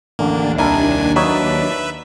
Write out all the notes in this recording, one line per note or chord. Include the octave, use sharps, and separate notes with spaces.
A1 D#2 D3 A#3 D4
C2 D#3 E4 A#4 G#5 A5
F#3 D#4 B4 C#5 E5